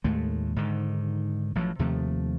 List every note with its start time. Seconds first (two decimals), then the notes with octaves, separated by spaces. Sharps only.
0.04 D#2 A2 G#3 A3
0.56 G#2 D3 D#3
1.55 A1 F3 F#3
1.79 D#2 C3 F3 A3